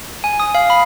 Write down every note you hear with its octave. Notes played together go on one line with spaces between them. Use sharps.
G#5
D#6
F5
B5